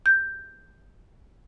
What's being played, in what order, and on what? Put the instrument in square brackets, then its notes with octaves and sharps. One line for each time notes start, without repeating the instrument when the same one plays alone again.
[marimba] G6